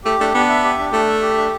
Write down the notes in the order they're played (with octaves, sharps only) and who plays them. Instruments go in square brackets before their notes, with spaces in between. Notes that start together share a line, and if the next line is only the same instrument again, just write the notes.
[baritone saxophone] A3 [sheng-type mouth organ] G4
[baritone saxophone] A3 [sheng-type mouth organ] D4
[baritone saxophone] B3 [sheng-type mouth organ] D4
[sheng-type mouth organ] E5
G4
D4
[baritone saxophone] A3 [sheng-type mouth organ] D4
[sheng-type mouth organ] E5
G4
D4